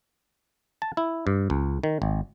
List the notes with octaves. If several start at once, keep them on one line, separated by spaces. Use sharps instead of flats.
A5
E4
G2
C#2
D#3
G#1